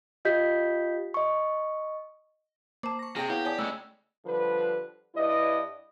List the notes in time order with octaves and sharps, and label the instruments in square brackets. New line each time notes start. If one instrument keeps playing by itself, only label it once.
[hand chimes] F4 G4 D#5 G6 B6
D#5 C#6
[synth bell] A#3 C5 [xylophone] A5 D6
[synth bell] C#6 A#6
[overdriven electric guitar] C3 [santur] G#4 G5 G#5 [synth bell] F6 A#6
[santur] B3 [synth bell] E4 [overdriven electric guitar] G4 [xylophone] C#5 F5
[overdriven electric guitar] G4 [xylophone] C#5 G#5 D#6 [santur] D5 A5
[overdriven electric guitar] C#3 G#3 [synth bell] A3 C#5 [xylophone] E6
[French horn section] D3 F3 G3 B4
G2 E4 B4 D5 D#5